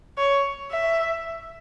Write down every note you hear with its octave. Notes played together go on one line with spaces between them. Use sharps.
C#5
E5